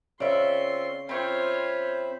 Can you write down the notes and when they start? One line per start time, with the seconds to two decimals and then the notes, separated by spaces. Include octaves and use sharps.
0.20 C#3 C4 F4 D5 E5 C6 C#6
1.09 C4 F4 C5 C#5 E5 B5 C#6